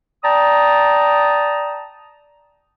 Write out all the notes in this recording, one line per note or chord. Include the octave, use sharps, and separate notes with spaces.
D5 G5 A5 A#5 D#6